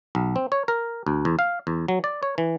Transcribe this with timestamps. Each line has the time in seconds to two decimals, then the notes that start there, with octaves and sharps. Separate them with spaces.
0.15 B1
0.36 C4
0.52 C#5
0.68 A#4
1.07 D2
1.25 E2
1.39 F5
1.67 E2
1.88 F#3
2.04 D5
2.23 C#5
2.38 E3